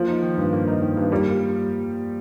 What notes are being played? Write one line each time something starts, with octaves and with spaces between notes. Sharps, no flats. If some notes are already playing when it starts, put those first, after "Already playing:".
Already playing: F3 A#3
D#4
D#3
G2
A#3
D#4
D#3
G2
G3 A#3